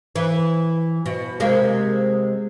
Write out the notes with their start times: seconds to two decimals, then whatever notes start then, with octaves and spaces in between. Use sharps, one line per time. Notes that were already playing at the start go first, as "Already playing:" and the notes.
0.16 E3
1.06 B2
1.40 C3 G#3 A#3